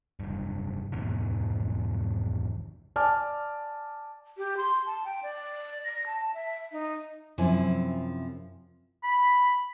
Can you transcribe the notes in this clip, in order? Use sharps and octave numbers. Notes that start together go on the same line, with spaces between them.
F1 G2
E2 G#2 B2 D#3
D5 G#5 A5 D6 F6
G4
C6
A5
G5
D5
A#6
A5
E5
D#4
F#2 C3 F3 E4 G#5
B5